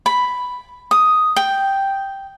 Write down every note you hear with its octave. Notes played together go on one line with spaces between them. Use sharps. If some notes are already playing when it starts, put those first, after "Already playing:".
B5
D#6
G5